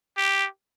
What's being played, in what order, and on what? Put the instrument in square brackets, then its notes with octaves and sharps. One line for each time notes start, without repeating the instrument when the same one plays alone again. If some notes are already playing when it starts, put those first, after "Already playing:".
[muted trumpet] G4